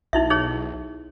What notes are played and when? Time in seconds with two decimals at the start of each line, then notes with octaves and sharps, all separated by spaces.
0.13 B1 D#4 E4 E5
0.30 D#4 G#4 C#5